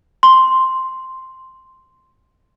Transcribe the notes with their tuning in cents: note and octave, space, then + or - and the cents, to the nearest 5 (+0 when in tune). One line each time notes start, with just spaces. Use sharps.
C6 +0